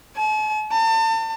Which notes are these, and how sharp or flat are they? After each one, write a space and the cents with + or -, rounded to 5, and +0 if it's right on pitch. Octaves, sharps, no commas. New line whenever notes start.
A5 -45
A5 +35